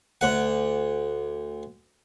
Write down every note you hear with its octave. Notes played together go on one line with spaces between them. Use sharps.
D2 F#5